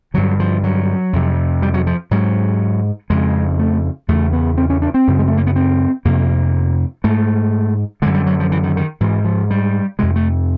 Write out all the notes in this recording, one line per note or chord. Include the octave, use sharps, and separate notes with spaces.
G2 D3 F#3
F3
F#3
F2 C3
G3
F#3
F3
G#2 F#3
F2 C#3 G#3
A3
E2 C#3 A3
B3
C4
C#4
D4
C4
F#2 C#3
G#3
A3
A#3
B3
C4
F2 C3 A#3
G#2 A3
F#2 D3 G#3
G3
F#3
F3
E3
D#3
D#3
G#2 E3
F3
G3
F2 C3 G#3
A3